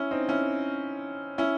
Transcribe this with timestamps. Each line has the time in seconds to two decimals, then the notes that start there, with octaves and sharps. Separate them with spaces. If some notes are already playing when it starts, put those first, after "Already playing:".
Already playing: C#4 E4
0.11 C4 D#4
0.29 C#4 E4
1.38 C#4 E4